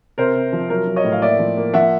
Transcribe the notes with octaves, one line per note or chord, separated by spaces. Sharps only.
C3 A#4 C5
C3
F3
F#3 A#4
F#3
C#5 D#5
A2
F5
A#3 D5 E5
F3
A#3
F3 E5 F#5